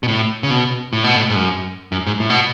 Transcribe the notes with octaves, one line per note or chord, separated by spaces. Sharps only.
B2
A2
C#3
B2
A2
B2
A2
G#2
F#2
F#2
G#2
A2
B2